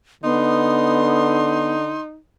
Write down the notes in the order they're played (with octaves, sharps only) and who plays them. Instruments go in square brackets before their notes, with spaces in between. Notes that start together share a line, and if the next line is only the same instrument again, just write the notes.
[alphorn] D3 [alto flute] B3 [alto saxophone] D#4 [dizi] C6